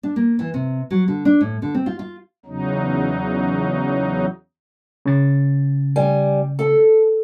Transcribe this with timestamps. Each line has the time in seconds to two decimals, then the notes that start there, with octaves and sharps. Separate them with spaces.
0.03 D4
0.16 A#3
0.39 E3
0.54 C3
0.91 F#3
1.08 D3
1.25 D4
1.41 A2
1.62 D3
1.75 C4
1.86 F4
1.99 F4
2.46 E2 C#3 F#3 D#4
5.06 C#3 A6
5.96 G3 G#5
6.59 A4